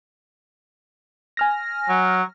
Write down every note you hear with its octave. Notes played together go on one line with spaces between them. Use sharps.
G#5 F6 A#6
F#3